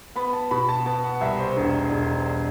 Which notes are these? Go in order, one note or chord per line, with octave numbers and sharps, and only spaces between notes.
B3 B5
A5
B2 B5
A5
B3 A5
F#5
C2 E5
C5
E1
E1